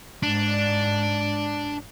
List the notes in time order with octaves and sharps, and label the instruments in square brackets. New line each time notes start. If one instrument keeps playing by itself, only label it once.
[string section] G#2 [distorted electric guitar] D4